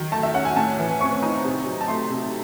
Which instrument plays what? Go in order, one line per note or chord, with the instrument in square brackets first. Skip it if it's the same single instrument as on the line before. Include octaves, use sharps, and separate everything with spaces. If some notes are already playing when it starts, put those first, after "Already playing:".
Already playing: [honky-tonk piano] D#3 F#3
[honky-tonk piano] A3 [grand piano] A5
[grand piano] E5
[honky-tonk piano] C#4 [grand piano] F#5
[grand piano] G#5
[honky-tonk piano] A2 [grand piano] A5
[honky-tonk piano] E3
[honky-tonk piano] C4 [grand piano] C#6
[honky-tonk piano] D#4
C3
F#3
[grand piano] A5
[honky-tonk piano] A3 [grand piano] C6
[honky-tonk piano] C3